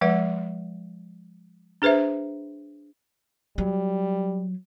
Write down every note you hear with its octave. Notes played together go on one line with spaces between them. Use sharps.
F3 G#3 B4 F#5
D4 G#4 B4 C5 E5
F#3 G3